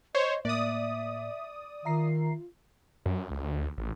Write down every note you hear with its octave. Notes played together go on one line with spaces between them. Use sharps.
C5 C#5 D#5
A2 A#3 D5 E5 D#6
D#3 F4 E5 A#5 C7
F#2
C#2
D2
A1